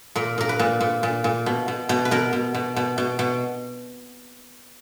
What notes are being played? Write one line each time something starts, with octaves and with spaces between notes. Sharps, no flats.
A#2 A#4
A#2 A#4
B4
A#2
A#2
A#2
A#2
B2
B2
B2
B4
B2 A#4
B2
B2
B2
B2
B2